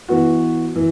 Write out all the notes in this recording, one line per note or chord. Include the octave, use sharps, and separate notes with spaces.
E3 B3 F#4
E3